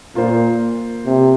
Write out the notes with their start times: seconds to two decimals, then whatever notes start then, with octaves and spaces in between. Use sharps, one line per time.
0.15 A#2 A#3 F4 C5
1.05 C3